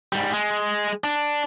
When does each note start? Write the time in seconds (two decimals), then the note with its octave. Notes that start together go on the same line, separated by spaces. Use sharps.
0.12 G#2 G3
0.34 G#3
1.04 D4